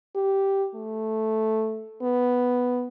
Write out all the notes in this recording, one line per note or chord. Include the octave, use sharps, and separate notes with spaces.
G4
A3
B3